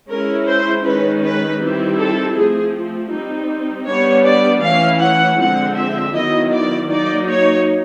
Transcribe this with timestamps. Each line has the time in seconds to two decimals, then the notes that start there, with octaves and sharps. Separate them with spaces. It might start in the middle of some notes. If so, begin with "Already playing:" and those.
0.08 G#3 C#4 E4 A#4
0.46 C5
0.84 D#3 G#3 C#4 B4
1.22 B4
1.60 D#3 G3 C4 E4
1.98 A4
2.35 F3 A3 C4 G#4
3.11 G3 C4 D#4
3.87 G3 B3 D4 C#5
4.25 D5
4.62 E3 A3 C#4 E4 F5
5.00 F#5
5.38 D3 F3 G#3 C4 F#5
5.76 E5
6.14 D#3 F#3 B3 E4 D#5
6.52 D5
6.89 F#3 A#3 D#4 D5
7.28 C#5